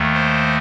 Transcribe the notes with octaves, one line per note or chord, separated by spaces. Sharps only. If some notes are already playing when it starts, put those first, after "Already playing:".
Already playing: D#2 D#3 A3
C5